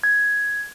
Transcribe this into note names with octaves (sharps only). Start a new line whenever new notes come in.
G#6